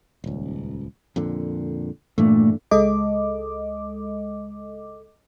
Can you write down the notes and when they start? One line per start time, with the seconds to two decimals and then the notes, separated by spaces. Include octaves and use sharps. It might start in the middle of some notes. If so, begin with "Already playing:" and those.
0.24 D#1 C#2
1.16 F2 A#2 D3
2.18 G2 A#2 E3 A3 D4
2.71 C#2 G#3 A4 D#5 D6